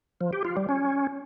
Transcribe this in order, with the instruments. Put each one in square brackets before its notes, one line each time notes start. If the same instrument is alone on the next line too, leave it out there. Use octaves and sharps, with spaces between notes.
[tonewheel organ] F3
G4
F4
G3
C#4